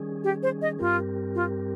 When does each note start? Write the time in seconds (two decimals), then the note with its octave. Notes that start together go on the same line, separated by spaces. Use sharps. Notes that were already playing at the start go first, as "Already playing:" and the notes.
Already playing: D#3 G3 C#4 G#4
0.24 G4
0.43 C5
0.62 D#5
0.79 G2 G3 C4 F4 G4 A#4
1.35 F4